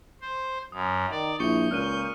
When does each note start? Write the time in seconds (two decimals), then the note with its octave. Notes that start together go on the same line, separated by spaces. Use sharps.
0.21 C5
0.72 F#2 D#6
1.11 D#3 D5
1.40 A#1 E4 C#6 G6 C#7
1.71 C#2 A#2 F6 F#6 D#7